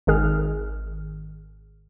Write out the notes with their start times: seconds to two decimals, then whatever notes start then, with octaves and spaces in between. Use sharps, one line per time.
0.07 G#1 D#3 G#4 F6